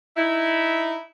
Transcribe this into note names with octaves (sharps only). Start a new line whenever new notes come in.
D#4 E4